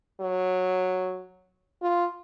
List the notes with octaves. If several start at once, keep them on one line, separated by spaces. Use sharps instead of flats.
F#3
F4